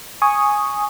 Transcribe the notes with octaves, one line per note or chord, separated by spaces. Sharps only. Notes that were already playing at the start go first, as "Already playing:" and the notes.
G#5 C#6 D#6